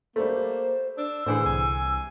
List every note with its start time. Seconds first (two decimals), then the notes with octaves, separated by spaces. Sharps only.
0.16 G3 A3 A#3 C5
0.97 D4 E6
1.26 A2 D3 E3 G#4 C5
1.46 C2 G#5